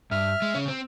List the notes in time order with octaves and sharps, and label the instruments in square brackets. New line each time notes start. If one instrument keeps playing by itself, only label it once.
[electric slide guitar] G2 [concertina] E5 F6
[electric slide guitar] G#3
C#3 C#4
C4